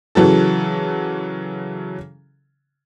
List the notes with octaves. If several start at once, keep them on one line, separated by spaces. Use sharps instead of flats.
C#3 E3 F#3 F#4 A4